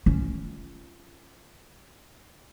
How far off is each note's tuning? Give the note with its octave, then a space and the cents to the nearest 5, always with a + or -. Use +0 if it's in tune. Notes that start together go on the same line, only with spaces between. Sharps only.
C#4 +0 F4 -25